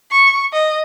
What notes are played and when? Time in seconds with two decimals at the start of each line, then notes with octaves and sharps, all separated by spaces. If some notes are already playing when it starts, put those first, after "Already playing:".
0.11 C#6
0.52 D#5